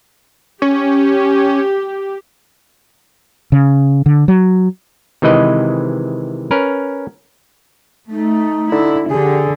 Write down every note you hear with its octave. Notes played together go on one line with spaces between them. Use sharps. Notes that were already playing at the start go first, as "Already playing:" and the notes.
C#4 G4
C#3
D3
F#3
C3 D#3 E3 G#3 B4 D#5
C#4 A#4 B4
A3 D#4
D3 E4
D3 G4 G#4